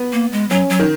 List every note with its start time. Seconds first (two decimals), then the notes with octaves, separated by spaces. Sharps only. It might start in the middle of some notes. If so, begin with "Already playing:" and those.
Already playing: B3
0.13 A#3
0.32 G#3
0.50 F#3 C#4
0.70 F#3
0.79 D#3